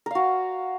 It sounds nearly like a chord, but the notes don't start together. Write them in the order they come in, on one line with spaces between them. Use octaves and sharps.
A#4 F5 F#4